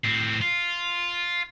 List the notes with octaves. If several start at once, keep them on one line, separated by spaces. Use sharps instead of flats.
A2 C4
F4